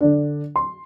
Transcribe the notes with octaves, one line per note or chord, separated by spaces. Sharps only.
D3 D4
C6